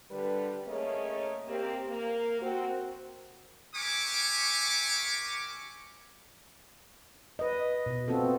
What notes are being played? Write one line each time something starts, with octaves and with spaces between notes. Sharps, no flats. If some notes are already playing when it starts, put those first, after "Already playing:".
D3 G3 B4
A3 A#3 C#4 G#4 C#5 D#5
A#3 C4 G4
A#3
C4 F#4
G4 A#4 E5 G#5 C#6 D6
B4 D#5
B2
B3 C4 F4 F#4 A4